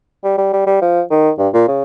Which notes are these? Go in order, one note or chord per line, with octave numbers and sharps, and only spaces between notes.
G3
G3
G3
G3
F3
D#3
G2
A#2
C#3